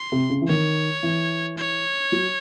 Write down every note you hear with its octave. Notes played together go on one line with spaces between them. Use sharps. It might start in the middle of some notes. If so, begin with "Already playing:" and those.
Already playing: C6
C3
C#3
E3
D#3 C#5
E3
C#5
F#3